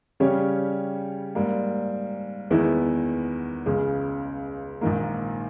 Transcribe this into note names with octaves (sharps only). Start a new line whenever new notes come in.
C#3 G3 C#4 G4 C#5
G#2 G3 A#3
E2 D#3 G#3 B3 E4
C#2 C#3 G#3
A#1 G#2 D#3 A#3